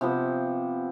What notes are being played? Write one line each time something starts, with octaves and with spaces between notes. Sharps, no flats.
C3 F3 B3